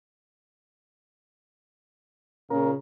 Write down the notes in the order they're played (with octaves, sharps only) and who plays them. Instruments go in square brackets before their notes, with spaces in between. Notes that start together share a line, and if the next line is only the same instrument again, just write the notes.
[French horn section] A#2 C#3 [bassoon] A#4